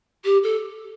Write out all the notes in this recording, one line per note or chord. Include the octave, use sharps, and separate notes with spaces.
G4
A4